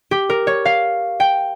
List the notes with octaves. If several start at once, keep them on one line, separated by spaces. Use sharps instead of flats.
G4
A#4
C#5
F5
G5